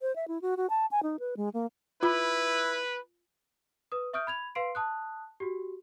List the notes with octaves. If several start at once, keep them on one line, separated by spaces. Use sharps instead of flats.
C5
E5
E4
F#4
F#4
A5
G#5
D#4
B4
G#3
A#3
E4 F4 B4 B5
B4 D#6
E5 C#6 D#6 F6 G6 D7
B5 G#6 F7
B4 F5 C6 C7 D7
A5 D#6 F#6
F#4 G4